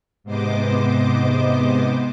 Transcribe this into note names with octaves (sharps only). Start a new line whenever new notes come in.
G#2 C3 B3 C5 D#5 D6